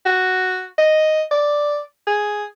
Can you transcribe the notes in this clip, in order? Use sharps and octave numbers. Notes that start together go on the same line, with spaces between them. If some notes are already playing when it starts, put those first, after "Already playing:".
F#4
D#5
D5
G#4